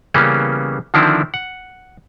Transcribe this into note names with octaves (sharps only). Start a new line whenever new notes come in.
C#3 E3 G3 A#3 B3 C#4
D3 D#3 F3 C4 D4 E4
F#5